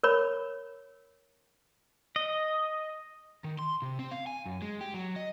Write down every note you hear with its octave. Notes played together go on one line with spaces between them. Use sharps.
A#4 C#5 B5
D#5
D#3
C6
C3
C4
F5
G#5
F#2
G#3
G4
F#3
D#5